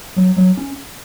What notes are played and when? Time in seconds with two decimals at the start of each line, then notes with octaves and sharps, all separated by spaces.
0.16 F#3
0.37 F#3
0.57 C#4